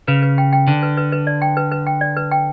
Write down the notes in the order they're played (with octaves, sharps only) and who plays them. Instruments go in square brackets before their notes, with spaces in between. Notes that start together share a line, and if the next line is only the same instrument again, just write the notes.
[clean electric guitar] C#3 [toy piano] B4
[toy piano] B4
G5
G5
[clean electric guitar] D3 [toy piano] B4
[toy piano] B4
B4
B4
D5
G5
B4
B4
G5
D5
B4
G5